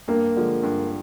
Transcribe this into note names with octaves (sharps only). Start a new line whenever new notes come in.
G2 A#3
D3 F3 G#3
G2